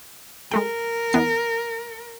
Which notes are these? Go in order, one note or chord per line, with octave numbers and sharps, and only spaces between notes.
G#3 A3 A#4 G5
E2 B3 C7